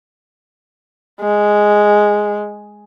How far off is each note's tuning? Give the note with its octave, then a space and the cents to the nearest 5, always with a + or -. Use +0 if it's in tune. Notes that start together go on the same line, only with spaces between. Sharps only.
G#3 +0